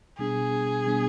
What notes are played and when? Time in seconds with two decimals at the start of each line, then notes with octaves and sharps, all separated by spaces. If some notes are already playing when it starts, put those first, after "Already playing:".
0.18 B2 G3 B3 D4 G#4
0.87 B2 G3 B3 D4